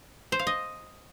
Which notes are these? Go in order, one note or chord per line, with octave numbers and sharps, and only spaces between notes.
C5
F5
D#5